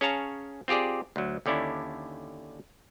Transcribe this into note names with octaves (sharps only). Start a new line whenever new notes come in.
C#4 G#4 C#5 F5 A5 A#5
C4 F4 G4 G#4 D5
D2 F#3
D#2 D3 C#4 D4 E4